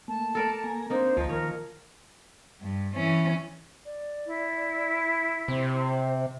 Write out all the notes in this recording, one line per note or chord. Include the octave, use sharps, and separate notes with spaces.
A3 A#3 A5
A4 A#4 D5
A#3 G#5 A#5
A#3 C4 D4 D#4 C5
D2 F3 D#4
D#3 A#4 C#5
G2
E3 C#4
D5
E4
C3 C5